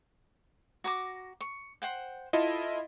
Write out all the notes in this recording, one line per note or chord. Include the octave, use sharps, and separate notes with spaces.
F#4 A#5 D6
C#6
C5 F#5 G5
E4 F4 A4 D#5